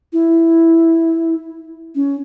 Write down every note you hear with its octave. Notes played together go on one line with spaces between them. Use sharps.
E4
C#4